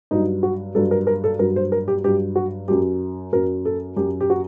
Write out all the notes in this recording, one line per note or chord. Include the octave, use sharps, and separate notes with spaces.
G2 F#3 D#4
F#4
G2 F#3 A4
A#4
A#4
A4
G2 F#3 A#4
C5
A#4
G4
G2 F#3 G4
F#4
F#2 F#3 G4
F#2 F#3 A#4
A4
F#2 F#3 G4
G4
F#4